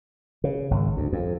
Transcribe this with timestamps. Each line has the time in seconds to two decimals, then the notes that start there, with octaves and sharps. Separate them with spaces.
0.44 C#3
0.71 G#1
0.97 D2
1.13 F2